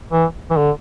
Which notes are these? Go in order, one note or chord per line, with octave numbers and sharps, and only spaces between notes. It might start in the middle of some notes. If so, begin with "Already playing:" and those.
E3
E3
D3